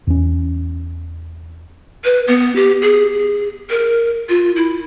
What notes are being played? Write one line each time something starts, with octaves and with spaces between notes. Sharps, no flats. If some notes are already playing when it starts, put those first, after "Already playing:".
E2 C#4
B4
B3
G4
G#4
A#4
F4
E4